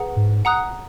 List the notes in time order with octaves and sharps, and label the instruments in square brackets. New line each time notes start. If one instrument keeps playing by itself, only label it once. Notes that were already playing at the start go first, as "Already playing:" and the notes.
Already playing: [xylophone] G#4 B4 F#5 A#5
[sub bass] G#2
[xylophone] F#5 A#5 D#6 F#6